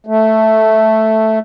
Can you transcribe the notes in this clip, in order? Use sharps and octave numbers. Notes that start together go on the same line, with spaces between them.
A3